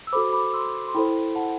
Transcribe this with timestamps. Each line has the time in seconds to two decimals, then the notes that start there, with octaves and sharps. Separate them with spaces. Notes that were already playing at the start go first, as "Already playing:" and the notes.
0.07 E6
0.12 F#4 A4 C5 B5 D6
0.33 B5 D6
0.53 C6 E6
0.88 C6
0.95 E4 A4 C5 G5 B5
1.35 F#5 A5